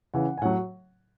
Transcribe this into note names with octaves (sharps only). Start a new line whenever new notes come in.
C#3 E3 F#5
G#5
A2 F#3 F#5